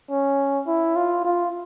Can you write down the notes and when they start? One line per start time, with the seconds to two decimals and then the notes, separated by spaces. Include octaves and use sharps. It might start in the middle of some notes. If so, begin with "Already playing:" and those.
0.10 C#4
0.67 E4
0.96 F4
1.24 F4